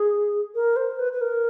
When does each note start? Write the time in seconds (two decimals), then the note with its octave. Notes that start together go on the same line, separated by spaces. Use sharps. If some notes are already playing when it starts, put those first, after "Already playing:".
Already playing: G#4
0.55 A#4
0.76 C5
0.99 B4
1.13 B4
1.21 A#4